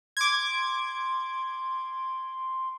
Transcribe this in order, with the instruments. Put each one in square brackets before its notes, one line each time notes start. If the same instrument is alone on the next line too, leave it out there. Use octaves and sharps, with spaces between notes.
[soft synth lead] C6 [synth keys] D6 G#6